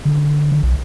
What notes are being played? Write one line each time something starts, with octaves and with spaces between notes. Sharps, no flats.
D3
D3
B1